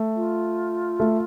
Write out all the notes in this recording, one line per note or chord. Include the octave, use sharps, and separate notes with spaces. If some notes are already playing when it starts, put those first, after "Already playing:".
Already playing: A3
F4
A3